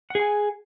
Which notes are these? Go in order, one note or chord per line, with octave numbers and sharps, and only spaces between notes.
G#4 F#5 G#5